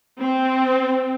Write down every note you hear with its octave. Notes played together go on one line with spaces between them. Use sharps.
C4